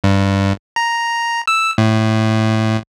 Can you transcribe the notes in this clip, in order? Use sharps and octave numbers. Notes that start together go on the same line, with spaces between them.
G2
A#5
E6
A2